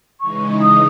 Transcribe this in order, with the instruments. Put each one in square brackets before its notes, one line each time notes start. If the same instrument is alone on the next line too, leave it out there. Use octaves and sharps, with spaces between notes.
[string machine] C#3 E3 G#3 D#4 [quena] C#6
[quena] D#6